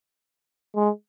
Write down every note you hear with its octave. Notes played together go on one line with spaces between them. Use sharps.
G#3